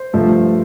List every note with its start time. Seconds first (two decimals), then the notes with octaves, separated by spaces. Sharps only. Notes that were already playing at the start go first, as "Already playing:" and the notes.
Already playing: C5
0.13 G2 F3 A3